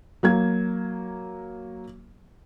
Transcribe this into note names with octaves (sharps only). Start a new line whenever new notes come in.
F#3 A#3 G#6